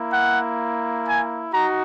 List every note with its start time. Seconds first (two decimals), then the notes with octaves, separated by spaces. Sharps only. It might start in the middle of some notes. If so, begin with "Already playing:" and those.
Already playing: A#3 E4
0.13 F#5
1.07 G#5
1.53 D#4 F#4 A#5